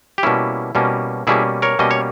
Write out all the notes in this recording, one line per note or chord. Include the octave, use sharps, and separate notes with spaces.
G4
B2 G3 A#3 C#4 E4
B2 G3 A#3 C#4
B2 G3 A#3 C#4 E4 G#4
A#4 C#5
B2 G3 A#3 C#4 D#5
C#5